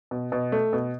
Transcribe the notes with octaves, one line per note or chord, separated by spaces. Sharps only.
B2
B2
A3
B2